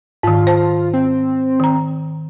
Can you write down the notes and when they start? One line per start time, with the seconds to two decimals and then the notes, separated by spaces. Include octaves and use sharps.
0.23 G#2 D#3 F4
0.47 C5 A5
0.93 C4
1.60 D#3 A#5